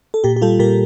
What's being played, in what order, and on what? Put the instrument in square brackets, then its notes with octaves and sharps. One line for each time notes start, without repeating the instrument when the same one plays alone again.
[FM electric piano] A4
A#2 G4
G4
G3 F4 A4
A#2 G4 A#4